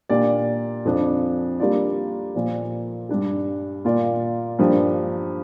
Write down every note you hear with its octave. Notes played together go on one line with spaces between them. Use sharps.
A#2 A#3 D4 G4 D5
F2 F3 D4
G3 A#3 D4 F4 D5
A#2 F3 A#3 F4 D5
G2 G3 D4 G4
A#2 A#3 F4 D5
G2 F3 A#3 D4 G4